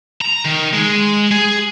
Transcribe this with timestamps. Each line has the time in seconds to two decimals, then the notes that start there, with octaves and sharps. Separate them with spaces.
0.21 A#5
0.45 D#3
0.73 G#3
1.31 G#4